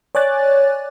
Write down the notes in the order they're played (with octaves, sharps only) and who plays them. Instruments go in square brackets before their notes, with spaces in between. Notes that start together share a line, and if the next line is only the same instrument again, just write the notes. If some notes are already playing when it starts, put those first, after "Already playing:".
[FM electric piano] C#5 D5 G#5 D6 F#6 A6